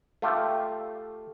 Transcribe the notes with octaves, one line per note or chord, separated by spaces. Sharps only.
A3 F4 G4